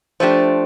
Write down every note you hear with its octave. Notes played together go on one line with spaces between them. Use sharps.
F3 A3 D4 G4 C5